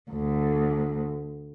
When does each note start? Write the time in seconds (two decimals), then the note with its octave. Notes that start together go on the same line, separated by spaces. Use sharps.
0.11 D2